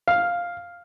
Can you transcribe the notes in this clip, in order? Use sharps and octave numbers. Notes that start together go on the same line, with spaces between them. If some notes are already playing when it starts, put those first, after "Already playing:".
F5